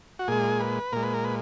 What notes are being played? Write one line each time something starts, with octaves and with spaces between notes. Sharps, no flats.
F#4
A#2 G#3 G#4
B4
A#2 G#3 A#4
B4
A#4
B4